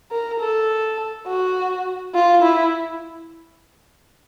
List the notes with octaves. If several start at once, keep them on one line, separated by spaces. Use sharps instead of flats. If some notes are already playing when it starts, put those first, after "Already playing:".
A#4
A4
F#4
F4
E4